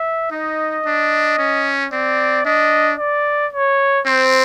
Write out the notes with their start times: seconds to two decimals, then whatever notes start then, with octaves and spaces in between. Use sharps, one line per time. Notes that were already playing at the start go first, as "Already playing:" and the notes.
Already playing: E5
0.31 D#4 D#5
0.86 D4
1.39 C#4
1.92 C4 D5
2.45 D4 D#5
2.99 D5
3.53 C#5
4.06 C4 C5